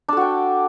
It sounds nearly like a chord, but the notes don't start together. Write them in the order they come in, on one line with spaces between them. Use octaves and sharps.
D4 A4 F#4 G5